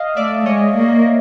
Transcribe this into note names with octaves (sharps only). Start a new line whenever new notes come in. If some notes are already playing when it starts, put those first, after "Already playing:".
Already playing: D#5 F5
A3 D5 E5
G#3 C#5 D#5
A#3